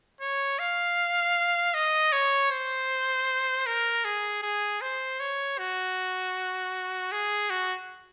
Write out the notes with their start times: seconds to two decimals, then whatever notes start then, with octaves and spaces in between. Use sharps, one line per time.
0.21 C#5
0.59 F5
1.74 D#5
2.12 C#5
2.51 C5
3.66 A#4
4.05 G#4
4.43 G#4
4.81 C5
5.20 C#5
5.58 F#4
7.12 G#4
7.50 F#4